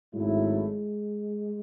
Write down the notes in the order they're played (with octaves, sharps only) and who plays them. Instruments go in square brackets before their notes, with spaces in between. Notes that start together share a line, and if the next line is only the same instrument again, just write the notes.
[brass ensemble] G#1 G#2 F#3 A3 E4 [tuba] G#3